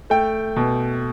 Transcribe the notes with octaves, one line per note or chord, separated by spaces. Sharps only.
A3 G5
B2